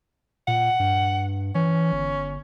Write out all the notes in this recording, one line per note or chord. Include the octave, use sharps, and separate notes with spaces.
A#2 F#5
G2
E3 C#4
G1